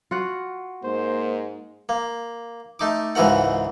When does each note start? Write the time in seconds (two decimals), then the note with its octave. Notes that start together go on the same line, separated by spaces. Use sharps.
0.11 F4 F#4 F#5
0.84 G#2 A#3 C5
1.89 A#3
2.79 A3 D#4 D6
3.15 C#2 G#2 E3 F#4 A#4 F#5